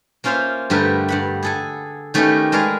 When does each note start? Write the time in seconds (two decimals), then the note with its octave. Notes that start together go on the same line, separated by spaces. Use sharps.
0.24 A#3 C#4 F4 C5 E5 F5
0.70 G2 D3 A3 G4 A#4 B4
1.08 G2 F#5 B5
1.43 G#4 A4 G#5
2.14 D#3 A3 C#4 G4 B4 D#5
2.52 G#3 A#4 B4 D5 F5 G#5